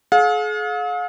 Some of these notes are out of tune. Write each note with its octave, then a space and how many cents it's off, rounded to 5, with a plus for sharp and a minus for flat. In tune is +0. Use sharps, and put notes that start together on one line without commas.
G#4 +45 F5 +40